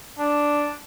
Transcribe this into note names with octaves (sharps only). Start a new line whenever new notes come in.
D4